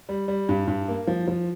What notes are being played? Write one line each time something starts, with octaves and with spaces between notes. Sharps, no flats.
G3
G3
G2
G2
A#3
F3
F3